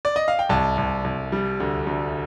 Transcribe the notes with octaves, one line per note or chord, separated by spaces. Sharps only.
D5
D#5
F5
G5
C2 A5
C2
C2
G3
D2
D2